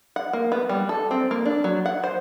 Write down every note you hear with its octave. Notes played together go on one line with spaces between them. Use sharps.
F#5
A#3
B3
G3
A4
C4
A#3
D4
F#3
F#5
C5